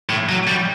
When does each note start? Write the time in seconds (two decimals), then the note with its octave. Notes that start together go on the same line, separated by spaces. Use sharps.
0.09 A2
0.29 F#3
0.47 G3